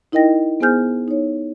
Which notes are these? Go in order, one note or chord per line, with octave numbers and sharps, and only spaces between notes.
D#4 E4 A#4 D#5 G5 A#6
B3 G#4 C5 G#5 F6 G6
D#4 C#5